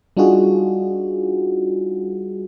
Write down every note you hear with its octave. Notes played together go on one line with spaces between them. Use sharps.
G3 D4 D#4 F4 F#4 G#4